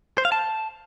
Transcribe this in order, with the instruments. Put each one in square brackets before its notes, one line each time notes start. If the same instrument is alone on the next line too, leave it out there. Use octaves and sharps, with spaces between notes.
[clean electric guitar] C5
F5
A5